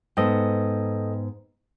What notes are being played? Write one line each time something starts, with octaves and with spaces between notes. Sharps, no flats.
G#2 B3 A4 D#5 G5